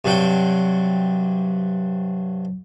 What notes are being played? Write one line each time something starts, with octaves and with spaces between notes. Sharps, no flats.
G2 C3 F#3 F#4 G5